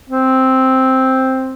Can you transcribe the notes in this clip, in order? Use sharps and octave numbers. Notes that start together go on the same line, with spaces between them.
C4